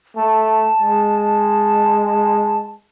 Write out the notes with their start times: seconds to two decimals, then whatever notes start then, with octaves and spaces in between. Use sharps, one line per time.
0.16 A3 A5
0.81 G#3